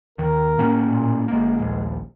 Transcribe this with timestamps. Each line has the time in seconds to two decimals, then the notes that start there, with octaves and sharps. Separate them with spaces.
0.18 D#2 D#3 A#4
0.58 A2 A#3 C#4
0.85 A#2
1.28 G1 G#3 A#3
1.58 D#1 A#1